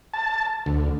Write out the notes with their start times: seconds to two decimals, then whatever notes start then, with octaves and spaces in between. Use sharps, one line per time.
0.14 A5
0.66 D2